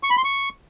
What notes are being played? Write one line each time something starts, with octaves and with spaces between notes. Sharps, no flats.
C#6
B5
C6
C#6